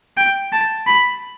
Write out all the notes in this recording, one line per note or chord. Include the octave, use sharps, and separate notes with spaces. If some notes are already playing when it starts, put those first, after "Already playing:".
G5
A5
B5